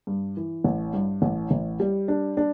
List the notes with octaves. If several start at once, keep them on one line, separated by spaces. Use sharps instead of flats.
G2
E3
A1
G2
A1
A1
G3
D4
D4